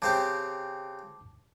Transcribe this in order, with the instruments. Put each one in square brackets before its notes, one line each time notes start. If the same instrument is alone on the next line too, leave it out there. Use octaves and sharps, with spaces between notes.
[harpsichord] C#3 C4 G4 [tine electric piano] A5 D6